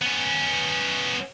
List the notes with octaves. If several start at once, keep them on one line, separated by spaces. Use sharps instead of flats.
B3 C#4